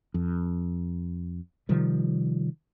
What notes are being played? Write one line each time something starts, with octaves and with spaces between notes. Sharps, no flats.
F2
C3 D#3 F3 G3